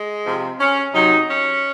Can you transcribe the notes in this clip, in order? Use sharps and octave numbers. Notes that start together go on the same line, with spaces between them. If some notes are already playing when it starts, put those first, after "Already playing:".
Already playing: G#3
C3 F3
C#4
C3 F#3 D#4
C#4